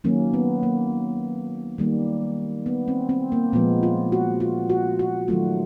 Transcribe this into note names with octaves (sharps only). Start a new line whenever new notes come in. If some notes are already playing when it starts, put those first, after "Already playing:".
D#3 F#3 A#3 C#4
B3
A#3
D#3 G3 A#3
B3
C4
C4
A#3
A#2 F3 G#3 B3
F4
F#4
F4
F#4
F#4
D#3 F#3 A3 F4